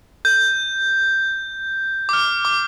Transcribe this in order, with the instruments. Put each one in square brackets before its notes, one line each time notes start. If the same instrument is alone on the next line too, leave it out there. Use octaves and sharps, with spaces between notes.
[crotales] G6
D6
F6
D6